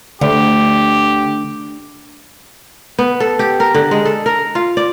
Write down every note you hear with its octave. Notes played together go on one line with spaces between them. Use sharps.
D2 D3 G4
B3
A4
G4
A#4
D3
G#3
A4
A#4
F4
D5